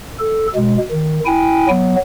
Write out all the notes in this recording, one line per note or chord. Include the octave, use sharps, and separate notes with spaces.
A4
B2 G#3
D#3
E4 G5 G#5
F#3 B3